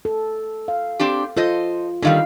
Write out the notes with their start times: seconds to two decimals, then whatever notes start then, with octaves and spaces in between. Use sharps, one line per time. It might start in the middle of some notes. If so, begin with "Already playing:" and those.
0.05 A4
0.68 F5
1.00 C4 D4 G4
1.37 F4 A4 C5 D#5
2.02 D3 D#3 G3 D#4 F5